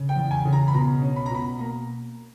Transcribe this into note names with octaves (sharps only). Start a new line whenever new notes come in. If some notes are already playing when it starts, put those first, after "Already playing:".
Already playing: C#3
G5
E2
G#5
C#3
A#5
B5
B2 A#5
C#4
B5
A#5
B2 B5
A#3 A#5